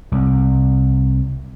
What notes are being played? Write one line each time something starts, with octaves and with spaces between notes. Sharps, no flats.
C2